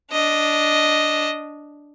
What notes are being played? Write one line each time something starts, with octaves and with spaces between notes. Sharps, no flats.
D4 D#5